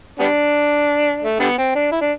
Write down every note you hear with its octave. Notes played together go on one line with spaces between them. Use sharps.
G3 B3 D4
A3
D3 G3 B3
C4
D4
E4
D4